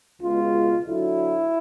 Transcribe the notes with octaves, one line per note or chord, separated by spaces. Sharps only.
C#2 B2 G#3 F4
D2 D3 F#3 E4